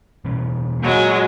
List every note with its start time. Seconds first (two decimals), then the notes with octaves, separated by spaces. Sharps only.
0.25 B2 E3 C#4
0.80 A#2 F#3 G#3